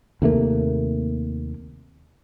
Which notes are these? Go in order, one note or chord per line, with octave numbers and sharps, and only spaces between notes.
D#2 C3 A3 A#3